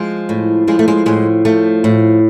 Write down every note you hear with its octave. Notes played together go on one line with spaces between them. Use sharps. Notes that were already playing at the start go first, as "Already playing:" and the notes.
Already playing: F3 G#3
A2
F3 G#3
A3
G#3
A2 G#3
F3 A3
A2